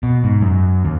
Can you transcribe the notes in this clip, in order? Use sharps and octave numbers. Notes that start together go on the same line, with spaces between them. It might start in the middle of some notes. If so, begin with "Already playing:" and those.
B2
G#2
F#2
D#2